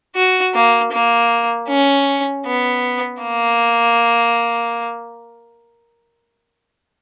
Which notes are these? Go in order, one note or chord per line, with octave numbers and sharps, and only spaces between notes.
F#4
A#3
A#3
C#4
B3
A#3